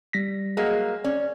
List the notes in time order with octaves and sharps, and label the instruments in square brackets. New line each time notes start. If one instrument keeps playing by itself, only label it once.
[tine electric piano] G3 A#6 B6
[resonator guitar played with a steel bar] F#3 G#3 A#3 [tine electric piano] G#4
[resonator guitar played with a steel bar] C#4 [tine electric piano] D5